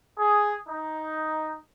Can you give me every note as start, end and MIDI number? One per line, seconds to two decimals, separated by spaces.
0.19 0.54 68
0.68 1.55 63